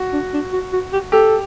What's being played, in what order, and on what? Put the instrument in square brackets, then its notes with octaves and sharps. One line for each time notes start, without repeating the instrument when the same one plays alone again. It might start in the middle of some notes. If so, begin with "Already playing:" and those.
Already playing: [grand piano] F#4
[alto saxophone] D4
D4
F#4
F#4
G4
[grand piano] G4 [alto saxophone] A4